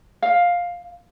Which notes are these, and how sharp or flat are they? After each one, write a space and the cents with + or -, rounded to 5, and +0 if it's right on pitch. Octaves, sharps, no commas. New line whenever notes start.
F5 +10